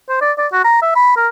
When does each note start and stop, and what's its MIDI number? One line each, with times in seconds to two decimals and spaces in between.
0.09 0.17 72
0.21 0.32 74
0.38 0.47 74
0.53 0.61 66
0.64 0.80 82
0.82 0.95 76
0.96 1.14 83
1.17 1.28 70